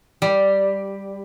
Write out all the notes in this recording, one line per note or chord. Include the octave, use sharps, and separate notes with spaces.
G3